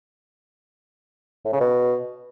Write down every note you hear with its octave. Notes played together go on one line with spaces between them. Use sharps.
A2
C#3
B2